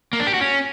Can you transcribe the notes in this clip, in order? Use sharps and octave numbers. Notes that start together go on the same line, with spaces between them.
A#3
D4
G4
F#4
C#4